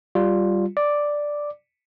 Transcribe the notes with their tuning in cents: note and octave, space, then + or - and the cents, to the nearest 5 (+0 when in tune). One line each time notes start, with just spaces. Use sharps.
G3 -5 F4 +0
D5 +0 D6 +0